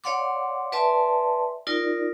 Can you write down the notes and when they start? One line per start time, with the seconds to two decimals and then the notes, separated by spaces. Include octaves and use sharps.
0.04 C#5 D5 F5 F#5 C6 D6
0.72 B4 D5 E5 G#5 A5 C6
1.67 D#4 F4 A#4 D5